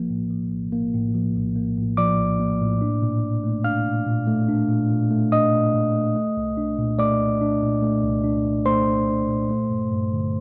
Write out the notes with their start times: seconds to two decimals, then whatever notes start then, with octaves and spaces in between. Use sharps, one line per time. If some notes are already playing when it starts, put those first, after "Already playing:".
Already playing: A#1 F3 A#3
0.10 A2
0.30 F3
0.52 A#1
0.72 A#3
0.94 A2
1.15 F3
1.35 A#1
1.56 A#3
1.77 A2
1.97 F3 D5 D6
2.19 A#1
2.40 A#3
2.61 A2
2.82 D4
3.02 A#2
3.23 A#2
3.44 A3
3.64 D4 F5 F6
3.86 A#2
4.06 A#2
4.27 A3
4.48 D4
4.69 A#2
4.90 A#2
5.11 A3
5.32 D4 D#5 D#6
5.53 A#2
5.74 A#2
5.95 A3
6.15 A3
6.37 C2
6.57 D4
6.78 A#2
6.99 A3 D5 D6
7.20 C2
7.41 D4
7.62 A#2
7.82 A3
8.04 C2
8.24 D4
8.45 A#2
8.66 A3 C5 C6
8.87 C2
9.08 D4
9.29 A#2
9.50 A3
9.70 G2
9.91 G2
10.13 D3